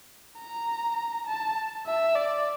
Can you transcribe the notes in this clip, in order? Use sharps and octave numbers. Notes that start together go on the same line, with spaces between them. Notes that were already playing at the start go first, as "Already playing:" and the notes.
A#5
A5
E5
D5